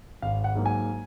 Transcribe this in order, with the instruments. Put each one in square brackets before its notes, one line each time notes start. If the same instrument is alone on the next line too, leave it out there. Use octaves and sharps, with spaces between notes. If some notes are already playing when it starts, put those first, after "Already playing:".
[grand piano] G#1 F5
F#5
G#2 F#3 A#3
G#5